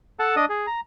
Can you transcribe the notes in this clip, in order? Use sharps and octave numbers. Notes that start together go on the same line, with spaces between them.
A4 F#5 A5
D4 D#5 D#6
G#4
A#5